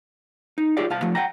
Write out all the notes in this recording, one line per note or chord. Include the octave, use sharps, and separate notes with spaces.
D#4
F4 G4 G#4 C#5 D5 F5
C2 F5 A5
F3 A3
F#5 G5 A#5